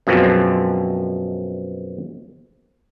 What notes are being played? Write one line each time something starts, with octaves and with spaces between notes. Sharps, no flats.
F#2 B2 F3 G#3 C4